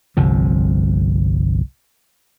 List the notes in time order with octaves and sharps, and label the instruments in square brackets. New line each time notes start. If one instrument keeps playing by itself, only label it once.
[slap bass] G1 C2 C3 F3